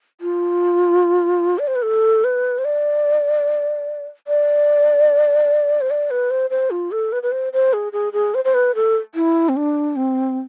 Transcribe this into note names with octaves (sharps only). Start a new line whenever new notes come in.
F4
D5
C5
B4
A4
B4
C5
D5
D5
C5
D5
B4
C5
C5
F4
A4
B4
B4
C5
C5
G#4
G#4
G#4
C5
C5
B4
A4
E4
C4
D4
C4